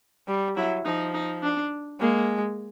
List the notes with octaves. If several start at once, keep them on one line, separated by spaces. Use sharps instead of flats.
G3
F#3 E4
F3 D#4
D#4
D4
G#3 A#3